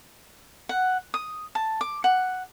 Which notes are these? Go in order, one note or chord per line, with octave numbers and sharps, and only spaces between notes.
F#5
D#6
A5
D6
F#5